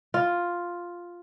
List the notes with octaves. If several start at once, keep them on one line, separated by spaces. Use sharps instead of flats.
F4